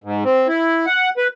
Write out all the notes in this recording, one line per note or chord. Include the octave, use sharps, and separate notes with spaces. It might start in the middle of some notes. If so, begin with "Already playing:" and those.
G#2
C4
E4
F#5
B4